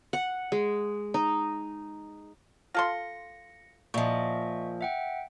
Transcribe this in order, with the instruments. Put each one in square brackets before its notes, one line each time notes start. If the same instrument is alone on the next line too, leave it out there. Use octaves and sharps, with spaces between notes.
[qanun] F#5
G#3
D#4
[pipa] F4 A4 C6 [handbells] A#6 C#7
[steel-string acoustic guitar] A#2 F3 [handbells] D#5 E5 C#6
[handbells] E5 F#5 G5